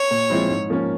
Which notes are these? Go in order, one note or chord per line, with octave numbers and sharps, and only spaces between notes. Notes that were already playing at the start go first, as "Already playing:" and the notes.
Already playing: C#5
A#2
F3 G#3 C4 E4
G#2
F3 A#3 C#4